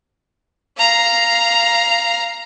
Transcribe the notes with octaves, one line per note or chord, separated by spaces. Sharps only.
F5 A#5